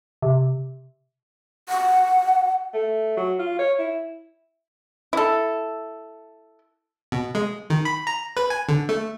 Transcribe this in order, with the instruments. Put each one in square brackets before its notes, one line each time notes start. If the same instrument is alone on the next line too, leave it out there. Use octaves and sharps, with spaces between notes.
[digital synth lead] C3
[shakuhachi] F#5
[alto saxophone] A3
F#3
F4
C#5
E4
[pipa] E4 A4
[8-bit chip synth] B2
G#3
D#3
B5
A#5
B4
G#5
D3
A3